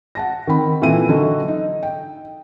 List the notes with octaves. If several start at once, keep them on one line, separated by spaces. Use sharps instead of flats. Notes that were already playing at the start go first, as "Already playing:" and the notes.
F#5 A5 A#6
D#3 C4 B5
A#2 E3 C4 A4 E5 D#7
D3 F#3 D#4 F#4 A4
D#4
G5